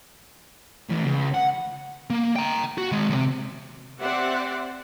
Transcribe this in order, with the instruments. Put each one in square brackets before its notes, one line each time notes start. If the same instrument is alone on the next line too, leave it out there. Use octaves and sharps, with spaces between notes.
[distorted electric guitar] A2 E3
C#2
F#5
[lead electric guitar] A#3
G5 A#5
F#4
D#3 G#3
E2 C3
[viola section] C4 G4 C5 D5 E5 F#5